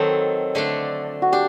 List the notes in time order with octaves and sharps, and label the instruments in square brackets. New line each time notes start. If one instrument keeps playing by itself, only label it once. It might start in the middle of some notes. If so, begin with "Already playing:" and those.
Already playing: [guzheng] D#3 F#3 C4 [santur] A4
[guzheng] D3 A3 D4
[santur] F#4
[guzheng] D4 [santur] G4